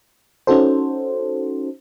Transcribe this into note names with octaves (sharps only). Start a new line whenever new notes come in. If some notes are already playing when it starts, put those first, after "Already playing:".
C#4 D#4 F#4 A4 C5